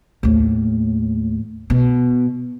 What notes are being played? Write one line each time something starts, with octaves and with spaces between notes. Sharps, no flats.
D#2 A2
B2